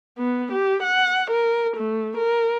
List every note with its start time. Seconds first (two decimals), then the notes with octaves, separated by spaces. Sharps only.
0.18 B3
0.52 G4
0.83 F#5
1.30 A#4
1.77 A3
2.17 A#4